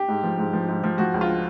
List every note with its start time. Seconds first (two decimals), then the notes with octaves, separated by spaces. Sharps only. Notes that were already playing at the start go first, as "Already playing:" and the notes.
Already playing: G4
0.08 G#2
0.24 F3
0.38 G#2
0.53 F3
0.68 G#2
0.84 F3
0.98 F3 F#4
1.14 C#2
1.21 F4